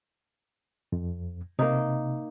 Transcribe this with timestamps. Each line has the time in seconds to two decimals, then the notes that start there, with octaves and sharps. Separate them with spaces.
0.92 F2
1.59 C3 A#3 D#4